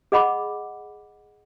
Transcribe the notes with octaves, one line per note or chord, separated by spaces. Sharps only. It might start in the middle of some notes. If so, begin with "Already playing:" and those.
G#4 D#5 F#5 B5 D6